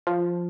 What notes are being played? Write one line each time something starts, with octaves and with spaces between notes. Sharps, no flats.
F3